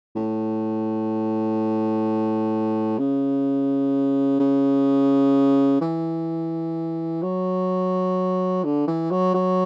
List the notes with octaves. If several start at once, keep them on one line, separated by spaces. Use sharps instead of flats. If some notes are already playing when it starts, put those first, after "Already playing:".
A2
C#3
C#3
E3
F#3
D3
E3
F#3
F#3